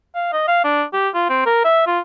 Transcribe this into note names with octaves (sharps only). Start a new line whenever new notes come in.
F5
D#5
F5
D4
G4
F4
C4
A#4
E5
F4